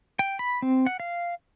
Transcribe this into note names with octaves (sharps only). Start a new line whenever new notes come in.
G5
B5
C4
F#5
F5